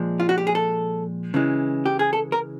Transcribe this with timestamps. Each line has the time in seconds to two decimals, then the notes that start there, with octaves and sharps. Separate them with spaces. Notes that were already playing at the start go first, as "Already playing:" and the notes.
Already playing: A#2 F3 G#3
0.20 F4
0.29 F#4
0.38 G4
0.47 G#4
0.55 A4
1.34 C#3 E3 G#3
1.86 G4
1.99 G#4
2.13 A4
2.32 A#4